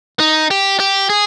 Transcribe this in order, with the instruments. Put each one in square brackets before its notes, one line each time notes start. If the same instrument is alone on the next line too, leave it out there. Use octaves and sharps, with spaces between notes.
[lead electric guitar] D#4
G4
G4
G#4